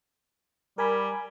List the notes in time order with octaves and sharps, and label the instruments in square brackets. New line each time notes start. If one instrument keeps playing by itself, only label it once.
[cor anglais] G3 [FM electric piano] A#4 G#5 B5